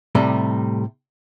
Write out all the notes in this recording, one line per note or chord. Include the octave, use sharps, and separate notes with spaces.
A2 C3 G3 A3 D#4